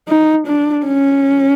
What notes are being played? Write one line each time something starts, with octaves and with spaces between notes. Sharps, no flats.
D#4
D4
C#4